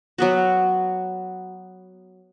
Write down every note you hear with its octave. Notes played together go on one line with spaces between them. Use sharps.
F#3 B3 F#4